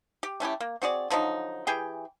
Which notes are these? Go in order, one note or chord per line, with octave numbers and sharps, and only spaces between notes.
G4
A3 C#4 E4 G4
A#3
C4 F#4 G#4 D5
D3 F3 F#3 D#4
E3 G4 G#4 G5